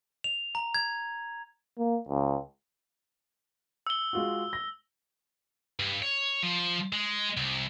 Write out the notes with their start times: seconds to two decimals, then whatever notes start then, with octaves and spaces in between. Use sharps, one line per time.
0.24 F7
0.55 A#5
0.74 G#6
1.78 A#3
2.09 C#2
3.87 E6 G7
4.13 G#3 F4 F#4
4.53 A#6
5.79 G2
6.02 C#5
6.43 F3
6.93 G#3
7.37 C2